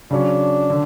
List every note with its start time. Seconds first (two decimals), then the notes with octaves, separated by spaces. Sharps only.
0.11 C#3 F#3 C#4 D4
0.70 D3